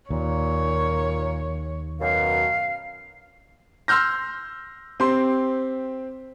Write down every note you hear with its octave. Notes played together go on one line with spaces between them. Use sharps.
D#2 A#2 C#5
F#2 B2 F5
C6 E6 F6 G6 A#6
C4 G4 C6